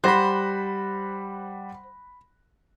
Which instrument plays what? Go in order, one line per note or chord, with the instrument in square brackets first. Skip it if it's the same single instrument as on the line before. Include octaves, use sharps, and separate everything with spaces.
[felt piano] G3 F#5 A#6 [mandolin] C5 [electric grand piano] B5 F#6